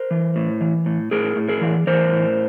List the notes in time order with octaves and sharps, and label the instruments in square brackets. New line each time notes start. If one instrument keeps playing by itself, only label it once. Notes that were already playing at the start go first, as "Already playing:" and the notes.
Already playing: [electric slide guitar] A#4 C5
E3
A2
E3
A2
A2 G#4 A#4
A2
G#4 A#4
E3
E3 A#4 C5
A2